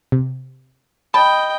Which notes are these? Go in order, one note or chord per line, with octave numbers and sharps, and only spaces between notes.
C3
D#5 G5 A5 B5